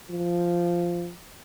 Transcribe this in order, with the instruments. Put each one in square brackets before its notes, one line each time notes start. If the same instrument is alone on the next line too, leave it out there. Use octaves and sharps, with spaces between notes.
[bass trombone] F3